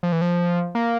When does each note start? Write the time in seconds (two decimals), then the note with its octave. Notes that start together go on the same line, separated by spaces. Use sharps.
0.03 F3
0.12 E3
0.22 F3
0.75 A#3